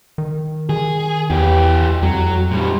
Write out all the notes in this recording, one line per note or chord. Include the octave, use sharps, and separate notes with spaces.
D#3
D#3 G#4
E2 E3 G4
F2 F#3
A#2 G3